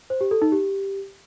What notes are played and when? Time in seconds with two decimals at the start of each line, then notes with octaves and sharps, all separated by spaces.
0.10 C5
0.21 G4
0.31 A4
0.42 D#4
0.52 G4